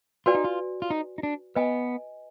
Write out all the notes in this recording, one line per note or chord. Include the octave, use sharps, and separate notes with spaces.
F4 F#4 B4 D5 G#5
D#4
F4
F4
D#4
D#4
D4
B3 B4 D#5 G#5